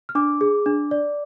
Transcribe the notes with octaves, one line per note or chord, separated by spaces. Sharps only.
F6
D4 D6
G#4
D4
D5